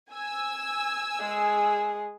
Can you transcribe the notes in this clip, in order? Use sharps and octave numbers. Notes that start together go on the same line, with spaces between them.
G#5 E6
G#3 G#4